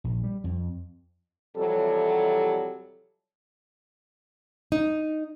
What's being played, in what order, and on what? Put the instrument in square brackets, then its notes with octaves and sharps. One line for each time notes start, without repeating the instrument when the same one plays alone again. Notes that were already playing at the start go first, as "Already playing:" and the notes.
[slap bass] A#1
G3
F2
[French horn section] F2 C3 E3 F#3 G3 A4
[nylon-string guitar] D#4